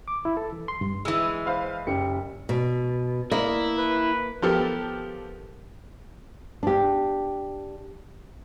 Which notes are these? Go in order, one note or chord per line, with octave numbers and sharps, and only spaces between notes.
D6
E4
A4
E3
C6
G2
E3 G#3 E6
C5 F5 B5
F#1 G4 C#7
B2
A#3 E4 D#5
B4
F3 B3 G4 A4 A#4
D4 G4